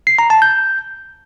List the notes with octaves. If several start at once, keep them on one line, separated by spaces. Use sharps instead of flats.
C7
A#5
A5
G6